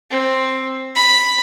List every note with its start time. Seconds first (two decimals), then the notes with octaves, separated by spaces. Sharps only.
0.11 C4
0.96 B5